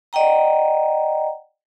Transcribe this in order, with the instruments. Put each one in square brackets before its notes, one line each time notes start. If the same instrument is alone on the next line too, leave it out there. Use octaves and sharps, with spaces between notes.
[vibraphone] D5 D#5 F#5 G5 A#5